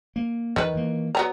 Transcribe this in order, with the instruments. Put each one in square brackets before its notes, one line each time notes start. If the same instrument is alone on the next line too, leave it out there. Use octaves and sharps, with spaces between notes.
[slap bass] A#3
[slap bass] E2 [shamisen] D#3 B4
[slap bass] E3 A#3
[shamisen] F#3 B3 A#5